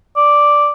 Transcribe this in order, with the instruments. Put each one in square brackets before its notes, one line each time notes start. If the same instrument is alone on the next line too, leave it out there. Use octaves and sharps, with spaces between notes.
[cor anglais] D5